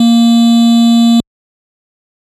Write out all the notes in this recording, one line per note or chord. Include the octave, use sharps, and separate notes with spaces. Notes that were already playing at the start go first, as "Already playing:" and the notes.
Already playing: A#3